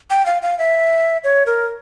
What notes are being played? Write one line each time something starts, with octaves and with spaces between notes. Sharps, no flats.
G5
F5
F5
E5
C#5
A#4